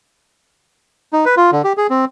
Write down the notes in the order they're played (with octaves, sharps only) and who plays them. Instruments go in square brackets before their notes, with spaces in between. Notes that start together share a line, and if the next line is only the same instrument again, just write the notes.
[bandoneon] D#4
B4
F4
D3
G4
G#4
C4